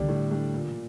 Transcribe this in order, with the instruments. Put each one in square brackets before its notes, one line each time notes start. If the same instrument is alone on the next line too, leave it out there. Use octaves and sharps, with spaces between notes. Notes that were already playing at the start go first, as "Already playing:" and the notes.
Already playing: [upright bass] D3 [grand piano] G3 D4 G4
[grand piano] A2
G3 D4 G4
A#2